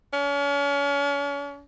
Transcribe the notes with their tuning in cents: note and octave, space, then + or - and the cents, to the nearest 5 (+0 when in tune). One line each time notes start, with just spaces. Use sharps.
C#4 +40